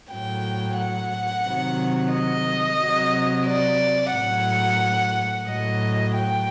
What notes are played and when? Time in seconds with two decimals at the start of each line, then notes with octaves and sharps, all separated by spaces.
0.11 A2 F#3 G5
0.79 F#5
1.45 C3 D#3 F#3
2.12 D#5
2.80 C3 F#3
3.46 D5
4.14 A2 F#3 F#5
5.48 A2 F#3 D#5
6.15 G5